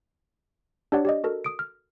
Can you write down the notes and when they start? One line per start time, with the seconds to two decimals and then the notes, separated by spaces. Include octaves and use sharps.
0.92 D4 G4 C#5 D5 F#5
1.05 G4 D5 D#5
1.24 F#4 A4 A#4
1.44 D#6 D7
1.59 F6